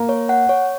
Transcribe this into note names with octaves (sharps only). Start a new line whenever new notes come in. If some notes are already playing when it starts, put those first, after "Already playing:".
Already playing: A#3
C#5
F#5
C#5